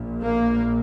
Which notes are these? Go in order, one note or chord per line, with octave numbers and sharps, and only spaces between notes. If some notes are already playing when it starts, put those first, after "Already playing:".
Already playing: A#1 A#2
A#3